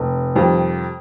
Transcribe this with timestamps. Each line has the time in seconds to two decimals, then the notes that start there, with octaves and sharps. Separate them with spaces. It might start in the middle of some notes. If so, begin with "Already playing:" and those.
Already playing: F1
0.35 F2 C3 D#3 G3